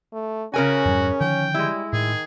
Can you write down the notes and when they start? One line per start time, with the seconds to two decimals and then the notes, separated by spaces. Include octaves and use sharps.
0.13 A3
0.54 C#3 C#4 F#4 A#4 G#5
0.86 F2 G#2 F#3
1.21 D3 D#3 F3 G5
1.54 G3 G#3 E4
1.93 A2 D#3 G#4